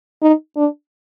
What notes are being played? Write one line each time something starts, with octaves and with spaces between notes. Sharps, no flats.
D#4
D4